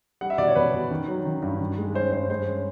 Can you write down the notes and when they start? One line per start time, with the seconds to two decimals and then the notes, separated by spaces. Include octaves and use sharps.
0.21 G3 F#5
0.30 E5
0.38 B2 D5
0.47 C#5
0.55 B2 B4
0.74 B2
0.91 D#3
1.08 F#3
1.25 D#3
1.42 G2
1.60 D#3
1.78 G#3
1.94 C#4 C5
2.12 G2 C5
2.30 G#3 C5
2.47 C#4